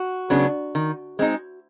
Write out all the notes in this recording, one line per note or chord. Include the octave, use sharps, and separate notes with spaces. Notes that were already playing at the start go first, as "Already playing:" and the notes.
Already playing: F#4
C#3 F#3 B3 D4
D#3
G#3 C4 D#4